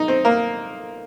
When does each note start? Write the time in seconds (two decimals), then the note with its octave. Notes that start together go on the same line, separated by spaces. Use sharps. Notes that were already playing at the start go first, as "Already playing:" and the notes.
Already playing: D#4
0.08 C4
0.25 A#3